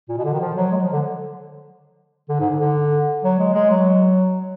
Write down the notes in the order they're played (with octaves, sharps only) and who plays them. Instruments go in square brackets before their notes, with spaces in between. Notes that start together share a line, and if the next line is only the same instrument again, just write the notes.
[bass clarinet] A#2
B2
D3
D#3
F3
F#3
G#3
F#3
F3
D3
D3
G#2
D3
D3
F#3
G#3
G#3
F#3